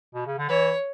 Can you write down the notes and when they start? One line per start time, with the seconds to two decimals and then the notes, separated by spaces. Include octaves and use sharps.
0.15 B2
0.27 C#3
0.38 D3
0.49 E3 C#5